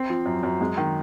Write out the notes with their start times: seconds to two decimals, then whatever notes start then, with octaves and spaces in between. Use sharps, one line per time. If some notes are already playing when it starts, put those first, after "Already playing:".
Already playing: C4
0.10 F3
0.26 F#2
0.43 F#2
0.61 G#3
0.77 D#3